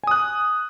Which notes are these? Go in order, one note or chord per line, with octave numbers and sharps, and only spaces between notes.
G#5 D#6 F#6